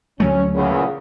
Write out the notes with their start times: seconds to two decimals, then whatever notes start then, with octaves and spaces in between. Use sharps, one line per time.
0.20 D2 F#3 A3 C#4
0.55 E2 A#2 C#3